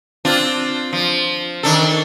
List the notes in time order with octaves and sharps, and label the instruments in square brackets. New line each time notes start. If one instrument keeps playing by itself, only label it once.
[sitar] C4 D4 F4
F3
D#3 D4 A4